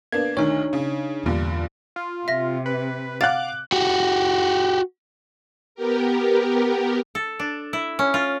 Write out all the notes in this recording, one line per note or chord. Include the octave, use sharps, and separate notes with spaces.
A#3 B3 D4 G#6
D2 D#3 D4 D#4 C#5
C#3
E2 G2 A#2 D3
F4
C3 E5 A#6
B4
F5 F#5 D6 F#6 A6
F#4 G4
B3 G4 A#4
A4
D4
E4
C#4
F4